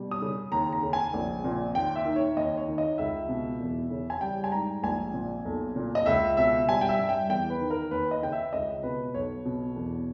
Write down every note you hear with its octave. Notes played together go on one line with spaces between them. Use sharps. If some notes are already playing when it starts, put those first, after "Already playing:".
Already playing: B2 G3
D#6
C#3
D#2 A#5
A#5
C#3
G#5
A#1
A#2
D#2 G5
E5
D#3
C#5
D#2 D#5
C#5
D#3
D#5
C#2 E5
B2
E2
C#3
G#5
G3 G5
G#5
G#2 A#5
A#1 G#5
A#2
B1
A#2
D#5
C#2 E5
B2 E5
G3 G#5
G5
E5
G2
G5
E2 G5
B4
D#3
A#4
D#2 B4
D#5
C#3 G5
E5
C#2 D#5
B2 B4
B1 C#5
B2
E2